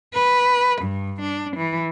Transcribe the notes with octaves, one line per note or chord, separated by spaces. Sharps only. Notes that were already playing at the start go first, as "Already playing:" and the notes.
B4
G2
D4
E3